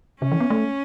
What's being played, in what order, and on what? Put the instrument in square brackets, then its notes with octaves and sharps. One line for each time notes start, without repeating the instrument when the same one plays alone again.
[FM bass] C#3 [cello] C#4
[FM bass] E3
B3
A3